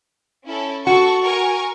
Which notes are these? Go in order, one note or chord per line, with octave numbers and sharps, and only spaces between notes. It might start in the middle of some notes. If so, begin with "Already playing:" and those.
C#4 E4 A4
F#4 A4 F#5 C#6
A#4 G#5 C#6